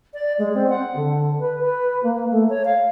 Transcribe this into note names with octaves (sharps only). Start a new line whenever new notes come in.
D5
G#3
C4
F#5
D3
B4
B4
A#3
A3
C#5
F5